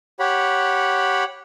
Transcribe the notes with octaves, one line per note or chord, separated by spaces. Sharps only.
G4 C#5 F#5 B5